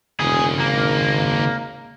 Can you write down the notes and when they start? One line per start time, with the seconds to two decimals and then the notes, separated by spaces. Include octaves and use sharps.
0.20 E1 D#2 C#3 G#4
0.60 G#1 A#3